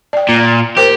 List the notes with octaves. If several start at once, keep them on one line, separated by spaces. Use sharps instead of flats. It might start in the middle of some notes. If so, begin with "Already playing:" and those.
D5 G5
A#2
G4 A#4 C5 G5